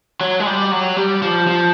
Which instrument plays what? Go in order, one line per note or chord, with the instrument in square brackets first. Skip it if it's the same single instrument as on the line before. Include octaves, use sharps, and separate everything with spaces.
[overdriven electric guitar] F#3
G#3
G3
F#3
G3
F3
F3